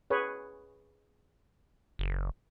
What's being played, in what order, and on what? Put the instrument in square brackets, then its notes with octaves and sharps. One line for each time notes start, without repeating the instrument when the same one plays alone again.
[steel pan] G#4 B4 C#5
[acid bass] F#1